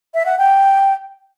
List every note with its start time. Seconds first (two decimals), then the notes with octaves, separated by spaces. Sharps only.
0.14 E5
0.26 F#5
0.38 G5